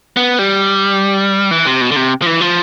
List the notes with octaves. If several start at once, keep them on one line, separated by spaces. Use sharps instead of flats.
B3
G3
E3
C3
B2
D3
C3
F3
E3
F3